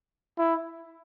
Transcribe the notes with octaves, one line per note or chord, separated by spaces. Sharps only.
E4